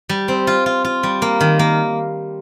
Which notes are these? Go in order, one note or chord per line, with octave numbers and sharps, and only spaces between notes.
G3
C4
F4
F4
F4
G3
A#3
D#3
A#3